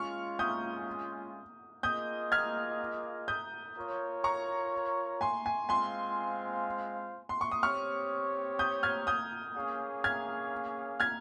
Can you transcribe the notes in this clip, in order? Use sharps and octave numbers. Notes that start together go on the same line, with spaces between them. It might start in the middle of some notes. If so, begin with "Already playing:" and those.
Already playing: G#3 C#4 F4 C#6 F6
D#6 G6
A#3 F4 G#4 D#5 D#6 G6
F6 G#6
D#6 G6
F4 A#4 C#5
A#5 C#6
G#5 C6
G#5
G#3 C4 F4 C5 F5 G#5 C6
C6
C#6
D#6
C4 G4 C#5 C#6 F6
D#6 G6
F6 G#6
D#6 G6
A#3 C#4 G#4 C#5 F5
F6 G#6
F6 G#6